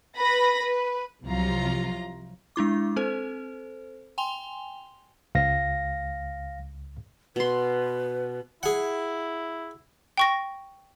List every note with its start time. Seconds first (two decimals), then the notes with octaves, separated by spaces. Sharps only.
0.18 B4 B5 A#6
0.62 B4
1.24 C2 C3 F3 F#3 F4 A#5
2.56 G#3 D4 E4 D6
2.96 C4 A4 C5
4.18 G5 G#5 C6 F7 G7
5.35 C#2 F5 A#6
7.36 B2 B4 C6
8.63 E4 G#4 F#5
10.18 G5 C#6 A#6